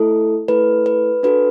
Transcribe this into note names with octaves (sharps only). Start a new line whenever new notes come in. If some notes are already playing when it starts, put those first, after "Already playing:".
Already playing: A3 E4 A4
A3 E4 A4 B4
B4
D4 F#4 A4 B4